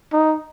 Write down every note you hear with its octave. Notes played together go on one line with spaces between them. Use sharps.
D#4